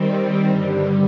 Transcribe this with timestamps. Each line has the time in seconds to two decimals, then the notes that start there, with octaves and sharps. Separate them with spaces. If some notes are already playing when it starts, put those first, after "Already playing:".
Already playing: D#3 G3 C4
0.46 G2 D3 G3